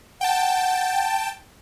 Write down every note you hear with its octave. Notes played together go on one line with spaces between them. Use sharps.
F#5 G5 A5